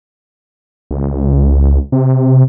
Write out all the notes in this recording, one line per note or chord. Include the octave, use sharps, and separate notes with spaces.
C#2
C3